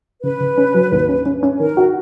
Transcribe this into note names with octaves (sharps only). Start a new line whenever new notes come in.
C#3 B4
C#3
C#4
F#3
D#2
C#4
C#4
C#4
D#3 A#4
F#4